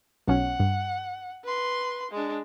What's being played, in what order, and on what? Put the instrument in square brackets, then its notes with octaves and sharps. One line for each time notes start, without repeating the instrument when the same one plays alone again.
[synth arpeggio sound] B1 C#4 [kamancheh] F#5
[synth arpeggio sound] G2
[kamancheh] B4 C6
G#3 D4